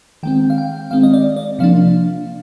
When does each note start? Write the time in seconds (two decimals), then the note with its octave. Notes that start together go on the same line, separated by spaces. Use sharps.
0.23 D#3 G#3 C4 G5
0.50 F5
0.58 G5
0.91 D#3 G#3 C4 F5
1.03 D#5
1.14 D5
1.37 D5
1.59 C3 F3 A#3 D4 F5